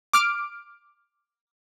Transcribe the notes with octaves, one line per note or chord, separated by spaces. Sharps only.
D6 F6 D7